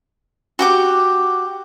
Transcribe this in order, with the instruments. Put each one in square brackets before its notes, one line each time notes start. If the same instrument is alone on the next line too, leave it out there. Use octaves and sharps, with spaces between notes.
[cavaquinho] F#4 G4 D6